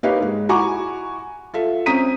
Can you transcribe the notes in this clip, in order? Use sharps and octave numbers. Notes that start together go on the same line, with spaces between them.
A#3 D#4 G4 B4 C#5 F5
G#2 G#3
E4 F#4 G#5 A#5 C#6 D6
F4 A4 E5
C4 C#4 A#5 D#6 B6 D#7